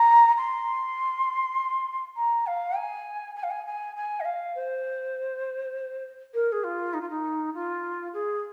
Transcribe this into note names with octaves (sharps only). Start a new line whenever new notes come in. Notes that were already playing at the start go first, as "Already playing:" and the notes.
Already playing: A#5
C6
A#5
F5
G#5
G#5
F5
G#5
G#5
G#5
D#5
F5
C5
A#4
G#4
F4
D#4
F4
D#4
F4
G#4